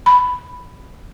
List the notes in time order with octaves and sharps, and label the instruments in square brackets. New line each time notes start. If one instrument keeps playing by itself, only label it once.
[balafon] B5